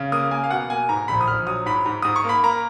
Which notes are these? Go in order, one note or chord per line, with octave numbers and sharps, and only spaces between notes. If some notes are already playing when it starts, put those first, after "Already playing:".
Already playing: C#3
A#3 D#6
A#3 G#5
F5
B2 F#5
A#3 G#5
G#2 A#5
A#1 B5
D#6
A#1 F6
F#3 D#6
G#2 B5
G#2
G#2 D#6
C#6
A#3 B5
A#3 A#5